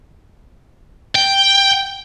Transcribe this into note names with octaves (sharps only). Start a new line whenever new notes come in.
G5